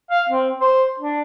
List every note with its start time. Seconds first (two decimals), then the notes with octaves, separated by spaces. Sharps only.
0.11 F5
0.29 C4
0.61 C5
0.99 D4